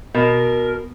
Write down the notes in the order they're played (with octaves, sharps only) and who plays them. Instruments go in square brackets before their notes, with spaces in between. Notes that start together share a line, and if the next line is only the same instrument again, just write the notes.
[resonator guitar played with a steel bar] B2 [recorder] A#4